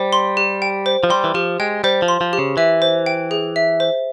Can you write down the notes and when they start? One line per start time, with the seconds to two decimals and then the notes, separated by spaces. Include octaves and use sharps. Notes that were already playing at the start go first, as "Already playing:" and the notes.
Already playing: G3 C5
0.13 C6
0.37 G4
0.62 G5
0.86 C5
1.04 F3
1.10 G3 C6
1.24 E3
1.34 F3 G4
1.60 G#3 G5
1.84 G3 C5
2.02 F3
2.08 C6
2.21 F3
2.33 G4
2.38 C#3
2.57 E3 E5
2.82 C5
3.06 G5
3.31 G#4
3.56 E5
3.80 C5